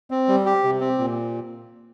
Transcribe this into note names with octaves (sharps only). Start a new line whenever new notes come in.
C4
G3
G4
C3
C4
A#2